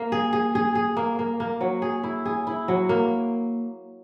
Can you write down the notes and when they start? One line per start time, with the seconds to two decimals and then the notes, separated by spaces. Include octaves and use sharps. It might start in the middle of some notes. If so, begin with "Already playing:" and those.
Already playing: A#3
0.12 G#4
0.33 G#4
0.55 G#4
0.75 G#4
0.97 A#3
1.19 A#3
1.40 A#3
1.61 F#3
1.82 G#4
2.03 E4
2.26 G#4
2.47 E4
2.68 F#3
2.89 A#3